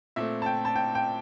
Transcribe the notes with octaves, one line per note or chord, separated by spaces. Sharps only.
A#2 A3 C4 E5
A5
G5
A5
G5
G5